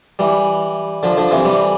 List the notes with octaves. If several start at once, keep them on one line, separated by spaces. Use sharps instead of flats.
E3 G3
D3 F3
D3 F3
C3 E3
E3 G3